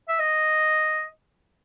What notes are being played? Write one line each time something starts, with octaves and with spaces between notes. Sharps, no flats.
E5
D#5